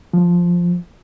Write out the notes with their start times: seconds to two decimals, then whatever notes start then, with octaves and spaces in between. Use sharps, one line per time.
0.13 F3